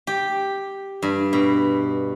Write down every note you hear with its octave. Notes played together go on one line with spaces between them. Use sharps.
G4
G2
B2